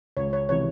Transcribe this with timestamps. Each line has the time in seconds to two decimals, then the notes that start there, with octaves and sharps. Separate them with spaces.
0.17 C#2 C#5
0.33 C#5
0.49 C3 E3 C#5